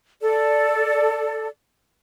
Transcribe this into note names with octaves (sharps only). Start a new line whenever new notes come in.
A4 D5